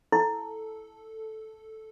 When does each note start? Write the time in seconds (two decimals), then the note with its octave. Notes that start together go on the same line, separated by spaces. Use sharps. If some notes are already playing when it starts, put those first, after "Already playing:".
0.12 E4 A4